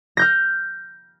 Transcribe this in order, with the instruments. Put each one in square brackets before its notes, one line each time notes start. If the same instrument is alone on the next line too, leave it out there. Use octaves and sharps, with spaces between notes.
[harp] F6 G6 A#6